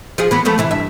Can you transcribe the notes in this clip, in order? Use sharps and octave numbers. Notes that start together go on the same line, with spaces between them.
F3 F4 G#4
E3 B3
F3 A3 B3
C3 E3 E4
G2 E5